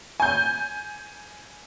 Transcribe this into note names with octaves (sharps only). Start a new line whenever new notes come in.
G#5 G6